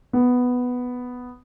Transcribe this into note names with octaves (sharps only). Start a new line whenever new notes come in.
B3